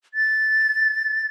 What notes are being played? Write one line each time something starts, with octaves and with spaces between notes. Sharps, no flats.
A6